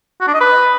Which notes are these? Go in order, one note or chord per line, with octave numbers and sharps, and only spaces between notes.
F#4
D4
D#5
B4